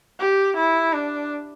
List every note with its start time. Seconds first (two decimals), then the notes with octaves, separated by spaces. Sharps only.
0.19 G4
0.57 E4
0.94 D4